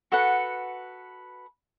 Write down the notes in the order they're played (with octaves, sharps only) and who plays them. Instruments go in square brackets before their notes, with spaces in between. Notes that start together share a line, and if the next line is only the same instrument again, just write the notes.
[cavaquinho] F#4 A4 B4 F#5